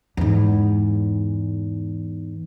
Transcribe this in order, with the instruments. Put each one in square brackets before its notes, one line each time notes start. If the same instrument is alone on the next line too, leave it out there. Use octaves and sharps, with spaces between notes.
[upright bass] E2 G#2